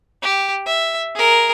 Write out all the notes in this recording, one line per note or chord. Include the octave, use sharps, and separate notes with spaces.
G4
E5
G#4 A#4